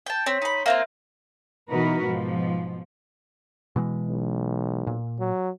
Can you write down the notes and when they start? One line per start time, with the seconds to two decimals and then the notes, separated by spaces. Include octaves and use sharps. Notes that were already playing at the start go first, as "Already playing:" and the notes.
0.06 G5 A5
0.26 C4 C#5 C6 B6
0.42 D#4 B5
0.66 A#3 C4 F4 E5 A#6
1.71 B2 E3 D#4 F#4 A#4 B4
2.04 G#2 B2 F3
3.76 B2 E3 G#3
4.09 B1
4.87 A#2
5.20 F#3